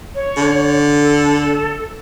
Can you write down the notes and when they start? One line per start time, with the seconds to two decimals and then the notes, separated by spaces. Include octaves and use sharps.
0.15 C#5
0.37 D3
1.03 A4